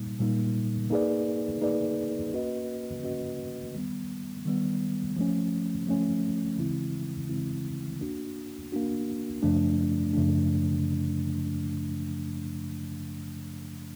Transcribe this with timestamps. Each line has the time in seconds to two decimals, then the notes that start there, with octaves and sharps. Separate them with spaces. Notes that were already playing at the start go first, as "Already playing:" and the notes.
Already playing: A#2 G3 A#3 D#4
0.20 A#2 G3 A#3 D#4
0.90 A#3 D#4 G#4 B4 D5
1.61 A#3 D#4 G#4 B4 D5
2.32 A#3 C#4 F#4 B4 D#5
3.03 A#3 C#4 F#4 B4 D#5
3.74 D#3 G3 B3
4.45 D#3 G3 B3
5.17 F3 A3 C#4
5.87 F3 A3 C#4
6.58 C#3 E3 G#3 C4 E4
7.29 C#3 E3 G#3 C4 E4
8.00 A#3 D4 F#4
8.72 A#3 D4 F#4
9.43 F#2 C#3 F3 A3 D4
10.13 F#2 C#3 F3 A3 D4